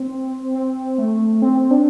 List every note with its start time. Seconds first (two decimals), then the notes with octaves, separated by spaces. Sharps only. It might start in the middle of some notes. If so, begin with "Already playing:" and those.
Already playing: C4
0.55 C4
0.98 A3
1.42 C4
1.71 D4